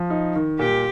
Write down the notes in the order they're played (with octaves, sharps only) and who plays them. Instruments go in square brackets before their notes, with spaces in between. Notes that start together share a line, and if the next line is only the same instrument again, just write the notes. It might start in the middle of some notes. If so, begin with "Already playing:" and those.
Already playing: [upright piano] F3
D#4
D#3
[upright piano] A#2 [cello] G4